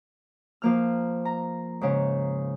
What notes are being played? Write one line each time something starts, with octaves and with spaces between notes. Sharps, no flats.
F3 A#3 F6
A#5
G#2 C#3